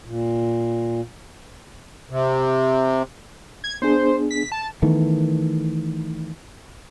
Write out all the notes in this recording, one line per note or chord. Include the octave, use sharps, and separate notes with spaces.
A#2
C3
G#6
B3 D4 G#4 C5
B6
A5
D#3 E3 A3 B3